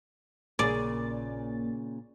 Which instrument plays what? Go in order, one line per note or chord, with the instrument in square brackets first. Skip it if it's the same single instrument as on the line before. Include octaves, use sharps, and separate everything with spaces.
[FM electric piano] A#1 A#3 A6 [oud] A#2 C#3 G#4 [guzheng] D5